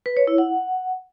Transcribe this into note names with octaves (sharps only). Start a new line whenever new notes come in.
B4
C#5
E4
F#5